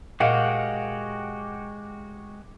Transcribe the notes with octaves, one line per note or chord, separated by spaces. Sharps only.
A#2 G#3 F#4 G4 D#5 F5 F#5